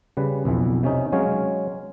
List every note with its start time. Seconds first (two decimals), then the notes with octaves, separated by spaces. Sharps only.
0.17 C#3 G3 B4
0.45 B1 F2 E3
0.83 C3 C#4 D#4
1.12 F#3 G#3 C#4 C#5 F5